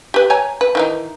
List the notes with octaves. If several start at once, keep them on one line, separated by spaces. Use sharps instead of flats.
G4 B4
C#5 G#5 A#5
B4
D#3 E3 D#4